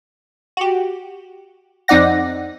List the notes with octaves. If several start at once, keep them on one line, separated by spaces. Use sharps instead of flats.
F#4 G4
F2 C4 D#4 D5 F#5 A#6